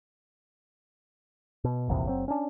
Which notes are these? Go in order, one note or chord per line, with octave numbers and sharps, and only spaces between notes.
B2
F1 A#1 E2 C3
F#1 F#3 C4
C#4 D4